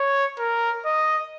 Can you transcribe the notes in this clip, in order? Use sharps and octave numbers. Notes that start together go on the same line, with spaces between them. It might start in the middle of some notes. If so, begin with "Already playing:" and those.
Already playing: C#5
A#4
D#5